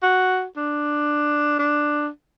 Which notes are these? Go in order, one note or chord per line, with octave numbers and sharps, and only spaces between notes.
F#4
D4
D4